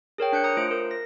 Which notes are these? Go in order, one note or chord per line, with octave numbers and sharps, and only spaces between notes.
G#4 A#4 C#5 G5
D4 F#6 G6 C#7
A#5 D#6 C#7
A3 F4 C5 D7
A#4
A#6